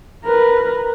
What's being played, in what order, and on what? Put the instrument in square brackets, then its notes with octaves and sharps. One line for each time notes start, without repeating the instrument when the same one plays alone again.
[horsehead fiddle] A#4 B4